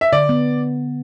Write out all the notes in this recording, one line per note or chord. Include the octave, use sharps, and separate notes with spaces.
E5
D3 D5
B3